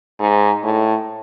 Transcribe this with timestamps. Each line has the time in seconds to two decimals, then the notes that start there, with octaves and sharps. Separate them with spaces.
0.19 G#2
0.63 A2